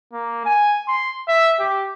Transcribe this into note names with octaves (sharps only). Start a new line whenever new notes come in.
A#3
G#5
C6
E5
G4